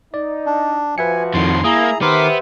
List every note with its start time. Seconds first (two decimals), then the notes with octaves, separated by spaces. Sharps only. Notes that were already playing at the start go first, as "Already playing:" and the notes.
0.14 D#4 D5
0.46 D4
0.98 F3 F#4 B4 E5 G#5 C#7
1.34 F2 A2 D#3 C6
1.64 A#3 E4 G#4 A#5 D#6
2.02 D#3 B3 G4 A#4 C5 E5 C6 D6